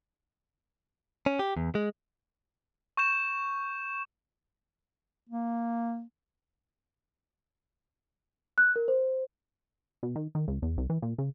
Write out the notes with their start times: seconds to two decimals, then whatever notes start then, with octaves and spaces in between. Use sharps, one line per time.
1.26 C#4
1.39 G4
1.57 E2
1.75 G#3
2.97 C#6 G6 E7
5.29 A#3
8.58 F#6
8.76 A#4
8.88 C5
10.03 B2
10.16 D#3
10.35 D#3
10.48 C#2
10.62 E2
10.78 C2
10.90 E3
11.02 A#2
11.18 C#3